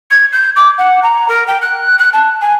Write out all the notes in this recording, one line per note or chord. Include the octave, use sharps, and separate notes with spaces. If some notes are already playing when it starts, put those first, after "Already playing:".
G#6
G6
D6
F#5
A#5
A#4
G5
F#6
F#6
A5
G#5